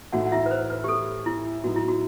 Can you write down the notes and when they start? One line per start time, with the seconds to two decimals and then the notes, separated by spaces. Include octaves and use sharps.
0.12 A2 E3 A3 D#4 F#4 F#5
0.26 F#5
0.32 E4 E5
0.46 B4
0.51 C5
0.70 B4
0.84 G4
0.88 A4
1.26 E4
1.64 A2 F#3 B3 D#4 F#4
1.76 E4
1.88 F#4